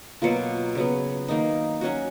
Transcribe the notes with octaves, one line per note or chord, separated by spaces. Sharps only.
B2 F#3 A#3 F4
C#3 F#3 B3
D#3 A#3 D#4
F#3 C#4 F#4